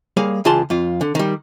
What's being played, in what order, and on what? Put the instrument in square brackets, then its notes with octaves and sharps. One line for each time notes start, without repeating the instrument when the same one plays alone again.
[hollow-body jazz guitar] G3 A#3 G#4 C#5 F5
C#2 E3 F4 G#4 A5 C6
F2 F4
D3
D#3 G3